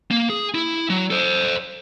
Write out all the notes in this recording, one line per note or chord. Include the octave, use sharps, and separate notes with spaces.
A#3
G#4
E4
F#3
A4 C5